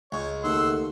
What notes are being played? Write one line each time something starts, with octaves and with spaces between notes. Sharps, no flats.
C#2 C#5
D#2 A3 F#5 C6 E6